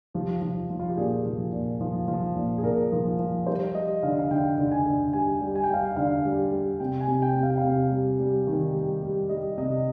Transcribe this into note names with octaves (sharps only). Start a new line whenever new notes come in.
F3 G4
F3
F3
F4
G4
A#2 G#4
F3
A#2
F3
F3
A#2
G#4
A#2 A#4
F3
F3
G3 C5
G3 D#5
D3 F5
F5
D3 G5
D3
G#5
D3
G3 G#5
G3
G#5
G5
G3
F5
G5
D3 F5
G3
G3
C3 G5
G#5
C3
G5
C3
F5
G5
F5
C3
G3
G3
D#3
G3
G3
G3 D#5
C3 D#5